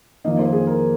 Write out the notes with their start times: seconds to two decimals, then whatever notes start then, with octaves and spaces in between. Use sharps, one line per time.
0.24 F2 D#3 A#3 D#5
0.39 C5
0.53 G#4
0.67 A#4